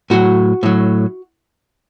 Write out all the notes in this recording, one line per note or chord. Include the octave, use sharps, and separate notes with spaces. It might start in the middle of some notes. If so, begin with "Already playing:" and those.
A2 F#3 F#4
A2 F#3